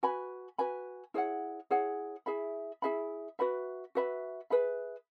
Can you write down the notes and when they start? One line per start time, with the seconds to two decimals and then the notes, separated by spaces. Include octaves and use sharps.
0.03 F#4 B4 G#5 B5
0.58 F#4 B4 G#5 B5
1.14 E4 G#4 C#5 F#5
1.70 E4 G#4 C#5 F#5
2.26 E4 G#4 E5 B5
2.82 E4 G#4 E5 B5
3.39 F#4 B4 E5 B5
3.95 F#4 B4 E5 B5
4.50 G#4 B4 E5 B5